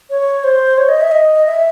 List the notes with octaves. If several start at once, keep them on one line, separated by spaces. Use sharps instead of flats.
C#5
C5
C#5
D#5
E5
D#5
E5